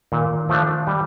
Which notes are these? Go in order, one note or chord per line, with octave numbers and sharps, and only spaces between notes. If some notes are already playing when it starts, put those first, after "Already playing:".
A#2 D#3
F3 A3 D4
G3